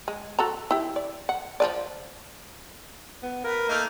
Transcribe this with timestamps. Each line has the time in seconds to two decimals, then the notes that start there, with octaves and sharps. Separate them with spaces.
0.08 G#3
0.39 F#4 A4 A#5
0.71 E4 G4
0.96 D5
1.29 F#5
1.60 F3 B4 D5
3.23 B3
3.44 A#4 B4
3.68 A3 A#3 D#4